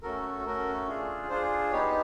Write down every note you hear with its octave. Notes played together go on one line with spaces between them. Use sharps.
A3 C#4 F#4 A4 A#4
A3 C#4 F#4 A4 A#4
D4 F4 G#4
D4 F4 G#4 C5
B3 D#4 G4 C#5